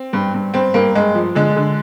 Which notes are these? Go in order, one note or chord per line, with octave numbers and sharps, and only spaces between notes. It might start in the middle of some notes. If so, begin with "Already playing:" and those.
Already playing: C4
G2
G2
G2 C4
G2 A#3
G2 G#3
F3
D3 G#3
D3